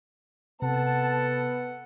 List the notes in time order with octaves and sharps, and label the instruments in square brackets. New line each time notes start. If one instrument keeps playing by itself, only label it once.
[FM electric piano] C3 [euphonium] B3 [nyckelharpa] A4 F#5 [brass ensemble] A5